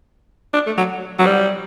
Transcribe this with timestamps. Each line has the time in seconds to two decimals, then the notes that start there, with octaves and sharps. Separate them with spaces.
0.54 D4
0.66 A3
0.78 F#3
1.19 F#3
1.26 G3